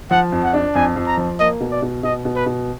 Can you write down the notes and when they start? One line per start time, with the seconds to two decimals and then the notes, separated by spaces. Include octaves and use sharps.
0.11 F3 F#5
0.32 F2
0.43 F#5
0.53 D4
0.75 F2 G#5
0.96 F2
1.07 A#5
1.17 F3
1.39 A#3 D#5
1.60 B2
1.72 D5
1.82 B2
2.03 B2 D#5
2.25 B2
2.35 B4
2.46 B2